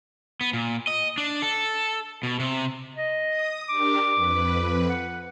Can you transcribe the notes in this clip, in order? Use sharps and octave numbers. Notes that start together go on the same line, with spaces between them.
B3
A#2
D#5
D4
A4
B2
C3
D#5
D#6
D4 G4 A#4 D6
F2 B4
F#5